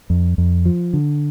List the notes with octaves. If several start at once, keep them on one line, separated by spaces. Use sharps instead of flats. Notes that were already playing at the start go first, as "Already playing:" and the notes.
F2
F2
F3
D3